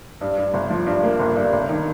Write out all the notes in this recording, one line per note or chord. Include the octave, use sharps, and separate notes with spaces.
G2
G2
G1
F3
G2
A#3
G1
G2
G1
D#3